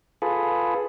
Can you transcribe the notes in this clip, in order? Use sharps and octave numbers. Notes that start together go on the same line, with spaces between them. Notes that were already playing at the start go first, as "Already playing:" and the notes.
F4 G#4 A4 B4